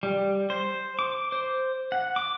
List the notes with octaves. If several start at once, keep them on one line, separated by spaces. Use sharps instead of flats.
G3
C5
D6
C5
F#5
D6